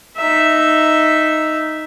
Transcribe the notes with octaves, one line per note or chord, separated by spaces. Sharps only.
D#4 E5